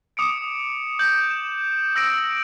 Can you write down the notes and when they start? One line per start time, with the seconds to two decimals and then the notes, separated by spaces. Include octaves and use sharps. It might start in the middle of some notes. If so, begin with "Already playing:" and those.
0.17 D6 D#6 C#7 D7
0.99 G6 F#7
1.31 E7
1.96 E6 A#6 D7